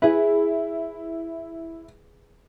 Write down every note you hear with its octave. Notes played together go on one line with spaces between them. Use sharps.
E4 G#4 B4